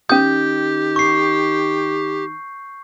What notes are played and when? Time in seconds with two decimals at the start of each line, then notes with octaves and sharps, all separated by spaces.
0.09 D#3 C#4 G4 D#6 G6
0.96 C#6 C7